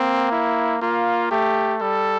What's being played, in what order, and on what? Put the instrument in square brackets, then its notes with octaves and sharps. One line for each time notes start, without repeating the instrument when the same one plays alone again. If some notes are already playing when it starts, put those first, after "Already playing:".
Already playing: [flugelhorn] A#3 [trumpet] C4
[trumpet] E4
[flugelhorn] A#3 [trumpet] F4
[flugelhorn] A3 [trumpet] G4
[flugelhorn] G3 [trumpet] A4